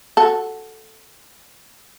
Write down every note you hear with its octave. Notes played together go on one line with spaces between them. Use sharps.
F#4 A4